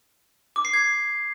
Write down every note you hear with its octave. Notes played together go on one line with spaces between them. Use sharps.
D6
C7
G#6